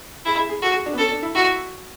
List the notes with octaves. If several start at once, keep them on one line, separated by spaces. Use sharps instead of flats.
E4 G#4
G#4
G#4
F#4 A4
G#4
D4
B3
C#4 A4
D4
E4
E4 F#4